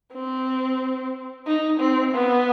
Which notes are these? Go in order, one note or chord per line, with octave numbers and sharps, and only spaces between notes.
C4
D#4
C4
B3